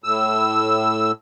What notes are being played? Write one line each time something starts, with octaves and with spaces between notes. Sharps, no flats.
A2 E6